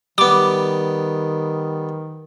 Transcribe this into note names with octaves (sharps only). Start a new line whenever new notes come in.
D#3 G3 B3 D6